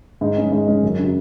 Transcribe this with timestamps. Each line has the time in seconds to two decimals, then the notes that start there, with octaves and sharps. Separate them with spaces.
0.21 G#2
0.37 G#3 C#4
0.52 G#2
0.68 G#3 C#4
0.83 F#2
0.98 C#3
1.03 F#3